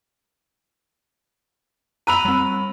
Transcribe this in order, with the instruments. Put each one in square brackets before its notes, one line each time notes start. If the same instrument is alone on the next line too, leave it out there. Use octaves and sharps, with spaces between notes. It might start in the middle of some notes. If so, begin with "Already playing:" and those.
[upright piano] A#5 B5 F7 [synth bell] E6 F#6 D#7
[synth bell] G3 C4